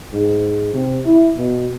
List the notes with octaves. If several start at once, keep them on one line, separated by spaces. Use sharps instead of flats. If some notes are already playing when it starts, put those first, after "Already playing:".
G#2
C3
E4
B2